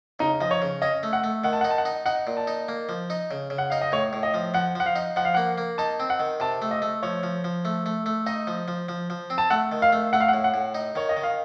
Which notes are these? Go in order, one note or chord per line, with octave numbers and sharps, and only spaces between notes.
C#3 D#4
F3 D#5
C#5
C#3
C#4 D#5
A3
F#5
A3
D#3 F#5
A5
D#4 F#5
A5
F#5
D#4
D#4 F#5
A#2
A5
D#4
A#3
F3
D#4
C#3
C#3
F#5
D#4 F5
D#5
A2 C#5
A2
D#5
F3
F3 F#5
F3 F#5
F5
D#4
F3 F#5
F5
A#3 F#5
A#3
D#4 A5
C4
F#5
D#3
C3 A5
A3
D#5
A3
F3 C#5
F3
F3
A3
A3
A3
D#4 D#5
F3
F3
F3
F3
C4
A5
A3 F#5
D#3
F5
A3
A3 F#5
F5
F#5
A2
F#5
A2
D#4
D#3 C#5
D#5
D#3
F5